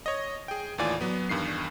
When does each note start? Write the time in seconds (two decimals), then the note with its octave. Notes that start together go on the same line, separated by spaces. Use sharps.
0.06 C#5 D#5
0.48 G#4 G5
0.78 D#2 A2 E3 F4 D5 G#5
1.01 F#3 B3
1.29 E2 G2 D#3 C7